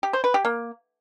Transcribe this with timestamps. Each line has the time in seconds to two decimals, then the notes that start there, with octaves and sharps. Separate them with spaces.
0.03 G4
0.13 C5
0.24 B4
0.34 G4
0.45 A#3